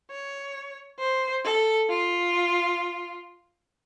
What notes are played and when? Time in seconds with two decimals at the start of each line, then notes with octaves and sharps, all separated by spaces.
0.11 C#5
0.99 C5
1.45 A4
1.89 F4